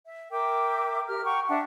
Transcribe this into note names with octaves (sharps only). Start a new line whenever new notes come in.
E5
A#4 E5 G5 D6
G4 A#4 F6
F#5 G5 A#5 C#6
D4 E5 F#5 A5